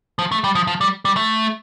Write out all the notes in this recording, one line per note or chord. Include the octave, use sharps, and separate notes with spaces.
F3
A3
G3
F3
F3
G3
G3
A3